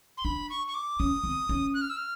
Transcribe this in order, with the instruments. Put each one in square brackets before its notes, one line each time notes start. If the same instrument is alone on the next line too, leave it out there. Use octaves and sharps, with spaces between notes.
[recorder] C6
[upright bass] D4 [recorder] B5
[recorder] C#6
C#6
D6
[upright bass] C#4 [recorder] D#6
[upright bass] C4
C#4
[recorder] F#6
F6
E6
F6